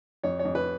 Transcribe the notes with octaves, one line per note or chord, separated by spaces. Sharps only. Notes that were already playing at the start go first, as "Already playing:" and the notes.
F2 C#5
C#5
F2
B4